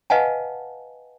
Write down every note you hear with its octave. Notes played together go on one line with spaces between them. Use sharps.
B4 D#5 F5 F#5 G#5 A5